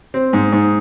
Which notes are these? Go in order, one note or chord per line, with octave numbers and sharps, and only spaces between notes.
C4
G#2
G#2